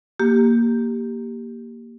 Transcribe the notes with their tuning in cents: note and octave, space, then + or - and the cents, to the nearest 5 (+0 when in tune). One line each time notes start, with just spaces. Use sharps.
A#3 +0 G4 +0